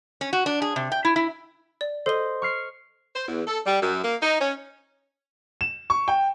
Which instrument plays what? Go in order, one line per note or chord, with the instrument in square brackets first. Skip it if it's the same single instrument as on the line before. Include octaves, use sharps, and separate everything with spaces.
[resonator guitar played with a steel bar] C#4
F#4
D4
G#4
C3
G5
E4
E4
[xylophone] D5
[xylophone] A4 G7 [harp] C5 D#5
[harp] C#6 F6 C7
[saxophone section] C5
E2
A4
G3
F#2
A#3
D#4
C#4
[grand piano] E7
C#6
G5